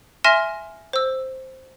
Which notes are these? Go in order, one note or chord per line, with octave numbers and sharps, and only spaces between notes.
E5 G#5 C6 F6 A#6 E7
C5 E6